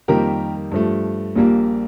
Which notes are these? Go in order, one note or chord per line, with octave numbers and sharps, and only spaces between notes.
F2 D#3 G3 A#3 G4 A#4
G2 F3 A3
A#1 A#2 G3 A#3